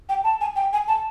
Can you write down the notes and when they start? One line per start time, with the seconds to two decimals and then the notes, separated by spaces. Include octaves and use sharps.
0.09 G5
0.24 A5
0.41 G#5
0.56 G5
0.73 G#5
0.88 A5